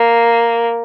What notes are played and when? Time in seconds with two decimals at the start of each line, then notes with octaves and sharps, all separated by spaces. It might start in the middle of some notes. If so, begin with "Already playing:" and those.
Already playing: A#3